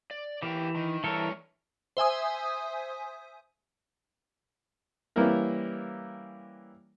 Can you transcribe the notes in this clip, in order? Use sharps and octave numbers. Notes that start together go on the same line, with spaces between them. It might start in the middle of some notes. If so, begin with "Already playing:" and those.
D5
E3 G4 A#4 G5
D#3
G2 E3 A4 A#4 C#5
C5 E5 G#5 D#6
E3 G3 A#3 C#4 E4 A#4